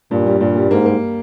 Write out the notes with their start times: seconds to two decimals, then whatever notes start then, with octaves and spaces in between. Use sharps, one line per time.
0.11 G2 A#2
0.26 G3
0.40 G2 A#2
0.56 G3
0.71 G#2 A#3
0.86 A#3